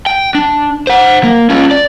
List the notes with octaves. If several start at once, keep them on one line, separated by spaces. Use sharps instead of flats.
G5
D4
C5 F#5
A#3
C#4 F4
D5